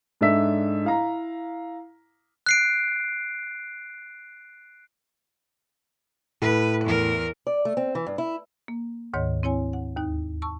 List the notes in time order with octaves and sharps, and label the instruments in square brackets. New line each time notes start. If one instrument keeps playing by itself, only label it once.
[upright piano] G#2 D4 A4 D5 E5 B6
E4 F5 A#5
[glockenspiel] F#6 C7 D7
[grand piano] A2 [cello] B4
[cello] E2 A#4
[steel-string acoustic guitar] D5
A3
C4
E3
G2
E4
[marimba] A#3
D2 G#2 D#3 C#5 D#5
C4 E4 C#5 G#5
F#5
D#2 D#4 F#6
A5 C#6 E6